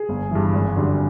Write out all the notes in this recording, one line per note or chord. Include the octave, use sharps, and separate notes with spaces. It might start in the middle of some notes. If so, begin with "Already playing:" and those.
Already playing: G#4
G1
G2 E3
G#1
F#2 D3 G3